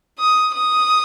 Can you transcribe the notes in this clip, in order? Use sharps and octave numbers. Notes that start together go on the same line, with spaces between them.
D#6
D#6